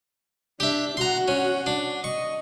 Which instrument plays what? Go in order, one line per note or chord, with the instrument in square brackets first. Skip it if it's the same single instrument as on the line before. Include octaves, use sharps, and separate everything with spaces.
[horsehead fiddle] D4 [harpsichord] G4 E5
[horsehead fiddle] F#4 F#5 [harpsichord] A#5 C6
[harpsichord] C#4
D4
[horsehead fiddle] D#5 [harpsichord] C#6